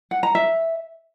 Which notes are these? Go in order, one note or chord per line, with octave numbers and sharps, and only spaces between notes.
F#5
A#5
E5